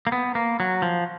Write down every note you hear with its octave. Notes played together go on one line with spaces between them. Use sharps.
A#3
B3
A#3
F#3
F3